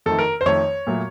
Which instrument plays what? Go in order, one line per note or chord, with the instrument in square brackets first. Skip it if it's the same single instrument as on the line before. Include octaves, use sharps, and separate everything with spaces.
[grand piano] F2 D#3 A3 A4
A#4
C5
F2 D#3 A3 C#5
A#2 F#3 A3